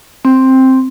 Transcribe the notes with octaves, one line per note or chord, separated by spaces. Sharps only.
C4